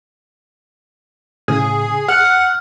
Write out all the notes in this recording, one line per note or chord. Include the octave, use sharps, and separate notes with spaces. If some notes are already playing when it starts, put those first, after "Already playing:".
A2 C#3 G#4
F#5 F6 F#6